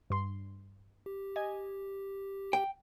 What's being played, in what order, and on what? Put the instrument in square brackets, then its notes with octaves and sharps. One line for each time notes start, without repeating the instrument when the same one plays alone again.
[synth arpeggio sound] G2 C6
[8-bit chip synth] G4
[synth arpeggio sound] D#5 G#5 G#6
[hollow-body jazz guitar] G5